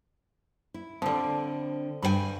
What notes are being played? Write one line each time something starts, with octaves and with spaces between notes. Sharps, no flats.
E4
D3 F3 G3 C4
G2 B4 G5 G#5 B5